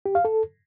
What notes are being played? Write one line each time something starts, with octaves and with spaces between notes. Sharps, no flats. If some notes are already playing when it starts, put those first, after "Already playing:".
G4
F5
A4